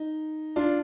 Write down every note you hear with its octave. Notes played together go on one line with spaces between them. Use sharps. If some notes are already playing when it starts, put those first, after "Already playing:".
Already playing: D#4
D4 F4